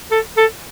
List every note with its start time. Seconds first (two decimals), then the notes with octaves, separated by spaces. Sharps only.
0.11 A4
0.37 A4